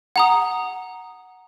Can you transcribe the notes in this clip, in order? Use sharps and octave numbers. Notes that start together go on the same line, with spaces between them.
F#5 A#5 D#6